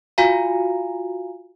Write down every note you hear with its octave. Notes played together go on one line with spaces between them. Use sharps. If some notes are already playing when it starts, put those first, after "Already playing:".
F4 F#4 F5 G#5 A#5